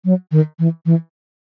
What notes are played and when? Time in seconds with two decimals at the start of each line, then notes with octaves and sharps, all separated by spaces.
0.05 F#3
0.31 D#3
0.59 E3
0.86 E3